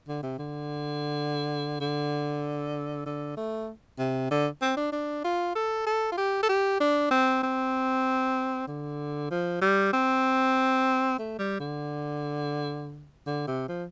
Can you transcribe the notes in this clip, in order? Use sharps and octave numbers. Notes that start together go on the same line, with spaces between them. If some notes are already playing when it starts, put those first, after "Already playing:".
D3
C3
D3
D3
D3
A3
C3
D3
C4
D4
D4
F4
A4
A4
F4
G4
A4
G4
D4
C4
C4
D3
F3
G3
C4
A3
G3
D3
D3
C3
F3